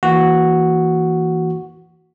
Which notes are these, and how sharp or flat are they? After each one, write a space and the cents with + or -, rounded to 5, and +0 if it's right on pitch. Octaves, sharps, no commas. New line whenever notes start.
E3 +0 A#3 +0 F#4 +0